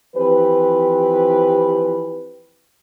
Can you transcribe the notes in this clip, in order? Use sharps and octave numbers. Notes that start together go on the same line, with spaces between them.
E3 F3 C4 G4 B4